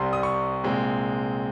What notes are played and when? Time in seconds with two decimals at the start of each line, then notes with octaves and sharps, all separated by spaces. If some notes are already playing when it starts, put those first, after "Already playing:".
Already playing: C2 C3 G3 C6
0.13 D#6
0.23 C#6
0.64 C2 A#2 G#3 C4